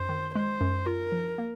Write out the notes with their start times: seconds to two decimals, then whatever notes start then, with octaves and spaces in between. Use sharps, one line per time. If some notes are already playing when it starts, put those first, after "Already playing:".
Already playing: F#2 C5
0.09 D#3
0.35 G#3 C5
0.61 F#2
0.86 F4 A#4
1.12 F3
1.38 A#3